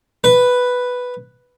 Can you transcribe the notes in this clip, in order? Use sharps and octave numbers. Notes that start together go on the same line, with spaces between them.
B4